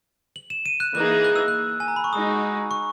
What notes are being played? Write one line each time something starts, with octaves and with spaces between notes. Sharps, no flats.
F#7
E7
D#7
F#6
E3 A#3 D#4 G#4 F#6
F#6
E6
F#6
G#5
A#5
B5
C#6
G#3 D#4 F#4 D#6
C#6